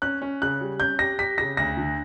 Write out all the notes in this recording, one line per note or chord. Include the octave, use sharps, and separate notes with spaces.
C#4 F#6
C#4
C#3 F#6
G3
C#4 G6
G4 A#6
G4 B6
C#3 A#6
D2 A#6
D3